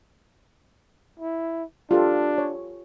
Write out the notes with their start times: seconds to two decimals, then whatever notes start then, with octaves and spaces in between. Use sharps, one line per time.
1.20 E4
1.91 D4 F4 G4 A4
2.38 C#5